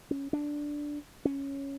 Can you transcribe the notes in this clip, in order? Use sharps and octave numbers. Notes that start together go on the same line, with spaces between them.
C#4
D4
C#4